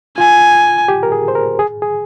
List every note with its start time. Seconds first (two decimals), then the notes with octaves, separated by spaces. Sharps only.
0.18 F4 G#5
0.88 G4
1.03 A#4
1.12 G#4
1.28 C5
1.35 A#4
1.59 G#4
1.82 G#4